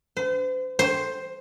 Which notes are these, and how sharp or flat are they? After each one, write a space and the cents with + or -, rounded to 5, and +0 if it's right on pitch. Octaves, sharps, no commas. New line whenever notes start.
C5 -40
C5 +5